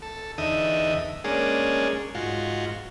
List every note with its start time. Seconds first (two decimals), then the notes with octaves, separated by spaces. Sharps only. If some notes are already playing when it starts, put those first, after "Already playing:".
0.02 A4
0.38 E2 D3 D#4 E5 D#6
1.24 G#3 A#3 C#4 D4 G#4
2.15 G#2 F4 F#4